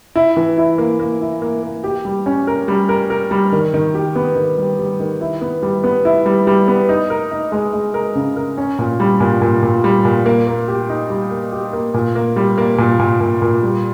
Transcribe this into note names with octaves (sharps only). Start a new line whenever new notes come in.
E4
E3
E4
A#3
A#3
E4
A#3
A#3
G4
G3
C#4
A#4
G3
A#4
A#4
G3
D#3
D#3
G4
B3
D#3
G3
G3
D#3
E4
B3
G3
B3
E4
G3
G3
B3
D#4
A#4
D#4
G#3
G#3
A#4
C#3
A#4
C#4
A#2
G3
A#2
A#2
A#2
G3
A#2
A#3
A#3
G4
D#4
G3
A#3
G4
A#3
A#2
A#3
G3
A#3
A#2
A#2
A#2
A#2
G3